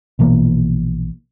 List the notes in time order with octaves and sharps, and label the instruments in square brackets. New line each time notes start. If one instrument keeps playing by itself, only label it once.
[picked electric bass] A#1 B2 E3 A#3